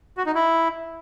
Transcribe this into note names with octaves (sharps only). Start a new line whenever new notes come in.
F#4
D#4
E4